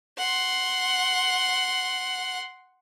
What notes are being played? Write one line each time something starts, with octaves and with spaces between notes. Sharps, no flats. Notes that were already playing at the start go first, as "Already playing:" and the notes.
F#5 C6